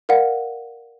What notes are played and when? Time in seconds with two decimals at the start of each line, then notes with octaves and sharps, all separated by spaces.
0.09 A#4 D5 F5 F#5